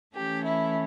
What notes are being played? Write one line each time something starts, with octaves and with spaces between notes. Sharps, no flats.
E3 A3 C#4 G4
E4